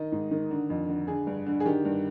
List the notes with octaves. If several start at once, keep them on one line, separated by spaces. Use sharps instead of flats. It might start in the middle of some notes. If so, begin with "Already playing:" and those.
Already playing: D#3 D#5
G#2
D#3
D3
F2
D3
D3 G#4
G2
D3
G#4
D#3 G4
G2